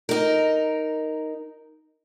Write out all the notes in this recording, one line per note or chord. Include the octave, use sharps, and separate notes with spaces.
D#4 A#4